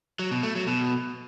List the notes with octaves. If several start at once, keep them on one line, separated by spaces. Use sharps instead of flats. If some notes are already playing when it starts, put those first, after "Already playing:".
F#3
B2
A3
F#3
B2